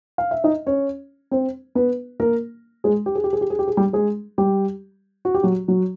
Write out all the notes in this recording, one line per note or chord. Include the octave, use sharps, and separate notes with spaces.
F5
E5
D#4 D#5
C#4 C#5
C4 C5
B3 B4
A#3 A#4
G#3 G#4
G4
G#4
G4
G#4
G4
G#4
G4
G#4
G3 G4
G#3 G#4
G3 G4
F#4
G4
F#3 F#4
F#3 F#4